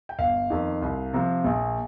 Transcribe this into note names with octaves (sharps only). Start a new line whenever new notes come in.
G5
G1 F5
F2 D#3
C2
C3 F3
A#1